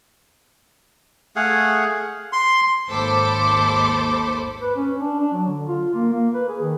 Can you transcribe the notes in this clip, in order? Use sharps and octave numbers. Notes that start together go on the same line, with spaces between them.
A3 G#4 F5 F#5
C6
G#1 D#2 A4 C5 B5 D6
B4
C#4
D4
D4
F#3
D3
F4
A#3
A#3
B4
G#4
D#3